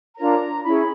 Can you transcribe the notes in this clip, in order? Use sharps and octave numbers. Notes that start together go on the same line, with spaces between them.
D4 F4 A#4 C#5 A#5
C#4 E4 G#4 B5